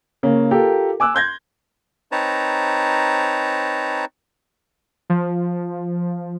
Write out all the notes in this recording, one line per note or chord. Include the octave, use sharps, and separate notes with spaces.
C#3 A#3 C#4
F4 G4 A4 A#4
G#5 D6 E6 F#6
C6 G6 G#6 A#6
C4 D#4 B4 C#5 A5 A#5
F3